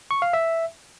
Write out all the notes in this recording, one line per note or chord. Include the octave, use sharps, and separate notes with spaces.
C#6
F5
E5